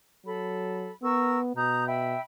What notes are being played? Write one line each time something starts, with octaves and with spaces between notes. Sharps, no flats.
F#3 A4 B5
B3 A#4 C#6 E6
B2 A#5 D#6 G6
E5 G5 B5